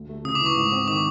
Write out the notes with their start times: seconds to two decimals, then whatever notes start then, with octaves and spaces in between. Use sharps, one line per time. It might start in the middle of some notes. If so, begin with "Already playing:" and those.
Already playing: D2
0.09 A3
0.25 C#3 D#6
0.35 D6
0.41 E3
0.46 C#6
0.56 G#2
0.72 C4
0.88 D#3 D6